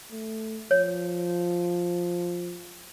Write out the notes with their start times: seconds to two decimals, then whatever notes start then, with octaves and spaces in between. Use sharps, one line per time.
0.11 A3
0.71 F3 C#5